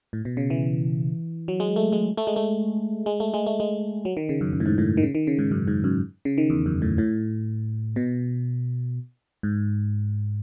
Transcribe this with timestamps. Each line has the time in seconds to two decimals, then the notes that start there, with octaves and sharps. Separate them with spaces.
0.13 A2
0.25 B2
0.37 C#3
0.50 E3
1.48 F#3
1.60 G#3
1.76 A3
1.92 G#3
2.17 A3
2.27 G#3
2.36 A3
3.06 G#3
3.20 A3
3.34 G#3
3.46 A3
3.60 G#3
4.05 F#3
4.17 D#3
4.29 C#3
4.41 F#2
4.53 F#2
4.60 A2
4.66 G#2
4.78 A2
4.97 D#3
5.03 C#3
5.15 D#3
5.27 C#3
5.39 G#2
5.51 F#2
5.68 G#2
5.84 F#2
6.25 C#3
6.38 D#3
6.50 E2
6.66 F#2
6.82 A2
6.98 A2
7.96 B2
9.43 G#2